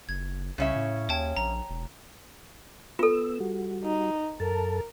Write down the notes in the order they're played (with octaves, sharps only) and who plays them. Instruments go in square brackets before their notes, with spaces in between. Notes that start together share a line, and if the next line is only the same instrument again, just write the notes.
[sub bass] F#1 [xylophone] G#6
[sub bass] C2 [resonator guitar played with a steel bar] C#3 C#4 E5
[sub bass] A2
[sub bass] D#2 [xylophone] C#5 G5 A5
[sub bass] A#1 [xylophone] A#5
[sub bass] E1
[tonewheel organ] B3 E6 [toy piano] F4 A4
[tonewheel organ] G3 F#4
[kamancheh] D#4
[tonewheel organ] F#2 A4 A5 [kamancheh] A#4